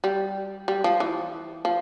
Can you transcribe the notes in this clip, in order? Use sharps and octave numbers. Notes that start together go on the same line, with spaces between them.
G3
G3
F3
E3
F3